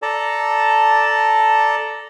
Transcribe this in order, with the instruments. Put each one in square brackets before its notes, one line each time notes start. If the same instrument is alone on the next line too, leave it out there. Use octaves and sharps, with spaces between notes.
[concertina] A4 D5 A5 A#5